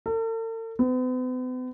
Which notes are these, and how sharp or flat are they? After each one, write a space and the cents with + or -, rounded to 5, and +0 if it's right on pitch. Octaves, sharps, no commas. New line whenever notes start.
A4 +45
B3 +45